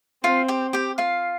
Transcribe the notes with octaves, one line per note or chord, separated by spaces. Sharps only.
C4 F4 F5
G4 G5
G4 G5
F4 F5